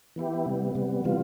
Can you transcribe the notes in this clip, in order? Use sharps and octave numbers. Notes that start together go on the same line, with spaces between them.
E3 B3 E4 G4
C3 G3 B3
C3 G3 B3
C3 E3 G3 B3 F4